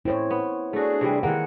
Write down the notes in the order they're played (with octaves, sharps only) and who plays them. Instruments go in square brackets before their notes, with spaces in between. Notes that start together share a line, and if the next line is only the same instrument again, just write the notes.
[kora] A2 C4 [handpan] E4 C5 C#5
[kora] B3
[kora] A3 F#4 [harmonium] D4 G#4
[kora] C3 E3 G3
[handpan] D#3 G#4 F#5 [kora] E3 G#3 A#3